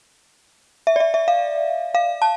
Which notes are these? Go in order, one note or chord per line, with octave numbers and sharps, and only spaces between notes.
E5
D5
E5
E5
F5
F5
A5